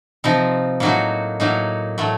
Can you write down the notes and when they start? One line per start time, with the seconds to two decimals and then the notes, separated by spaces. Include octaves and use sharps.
0.24 C3 F3 C4 D#4
0.80 A2 F#3 A#3 D#4 F#4
1.40 A2 F#3 A#3 D#4
1.98 A2 F#3 A3